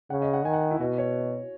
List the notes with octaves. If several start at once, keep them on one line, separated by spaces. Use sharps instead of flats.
C#3 F#5
D#5
F#5
D#3 G#5
F#5
E4
B2 F#4
C#5